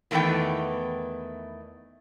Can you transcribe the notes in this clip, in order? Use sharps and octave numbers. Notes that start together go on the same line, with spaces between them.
E2 D#3 E3 A3 B3 G5